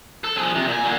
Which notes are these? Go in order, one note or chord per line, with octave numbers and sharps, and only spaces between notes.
A4
F3 G#4
C3
A#2 G#5
D3 A#3